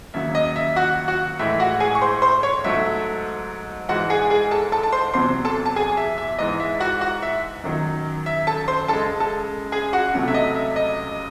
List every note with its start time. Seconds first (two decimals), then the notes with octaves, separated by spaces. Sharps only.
0.14 D#2 C#3 F#3 E5
0.35 D#5
0.56 E5
0.76 F#4 F#5
1.08 F#4 F#5
1.39 A2 E3 G#3 E5
1.60 F#4 F#5
1.80 G#4 G#5
1.95 C#6
2.02 C5 C6
2.22 C5 C6
2.43 C#5 C#6
2.64 G#2 F#3 A3 E5
3.89 G#2 E3 G#3 F#4 F#5
4.10 G#4 G#5
4.30 G#4 G#5
4.51 A4 A5
4.72 A4 A5
4.83 A5
4.92 C5 C6
5.14 E2 C3 F#3 C5 C6
5.45 A4 A5
5.66 A5
5.76 G#4 G#5
5.97 E5
6.18 E5
6.39 G#2 E3 G#3 D#5
6.60 E5
6.80 F#4 F#5
7.01 F#4 F#5
7.23 E5
7.64 F#2 D#3 F#3
8.26 E5
8.47 A4 A5
8.68 C5 C6
8.88 F#2 C#3 G#3 A4 A5
9.20 A4 A5
9.72 G#4 G#5
9.93 F#4 F#5
10.14 C#2 C3 F#3 A3
10.28 E5
10.34 D#5
10.55 E5
10.76 D#5